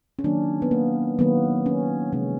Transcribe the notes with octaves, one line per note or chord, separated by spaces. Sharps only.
C#4
D#3 F#3 A#3 D4
B3
A#3
D#3 F#3 A#3 B3
C#4
C3 F3 G#3 C#4